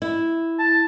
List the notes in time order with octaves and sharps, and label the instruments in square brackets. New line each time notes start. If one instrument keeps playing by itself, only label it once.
[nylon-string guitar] E4
[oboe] A5